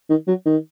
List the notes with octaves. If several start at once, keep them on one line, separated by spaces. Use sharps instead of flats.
D#3
F#3
D#3